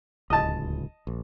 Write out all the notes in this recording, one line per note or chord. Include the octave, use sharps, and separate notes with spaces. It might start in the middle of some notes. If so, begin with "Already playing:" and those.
D1 C#2 D#5 A5
A#1